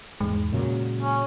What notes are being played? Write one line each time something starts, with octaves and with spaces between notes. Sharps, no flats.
E2 G#2 G#3
A#2 C#3 F#3
C#4